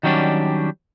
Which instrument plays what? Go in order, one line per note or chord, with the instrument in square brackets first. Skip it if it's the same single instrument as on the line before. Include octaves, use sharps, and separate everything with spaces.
[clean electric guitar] D#3 F#3 G3 C#4 D4